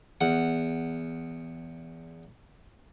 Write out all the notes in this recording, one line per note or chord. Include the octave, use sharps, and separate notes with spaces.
E2 F#5